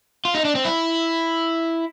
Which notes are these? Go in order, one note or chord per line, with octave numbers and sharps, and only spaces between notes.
F4
D#4
D4
C4
E4